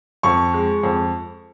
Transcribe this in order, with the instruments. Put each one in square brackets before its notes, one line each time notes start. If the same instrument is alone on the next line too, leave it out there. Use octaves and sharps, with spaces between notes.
[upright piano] F2 C#6
G#3
F2